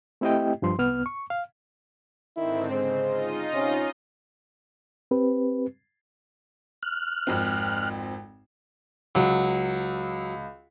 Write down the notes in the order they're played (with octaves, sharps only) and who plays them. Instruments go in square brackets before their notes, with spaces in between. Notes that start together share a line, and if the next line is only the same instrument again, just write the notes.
[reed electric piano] A3 C4 E4 G4 D#5 G5
G2 F3 C6
C2 B3 F6
C#6
F5
[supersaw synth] G#2 D3 C4 [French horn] D#3 [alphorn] E4
[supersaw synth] C#3 [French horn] G#3 [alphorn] C5
[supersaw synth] D#4 F4 D#5
[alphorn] C3 [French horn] C#4
[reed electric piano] C4 G4 B4
[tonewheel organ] F6 F#6
[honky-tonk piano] G#1 F2 C4
[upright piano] C#2 [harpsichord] F#3